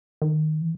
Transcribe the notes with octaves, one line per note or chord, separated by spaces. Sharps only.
D#3
E3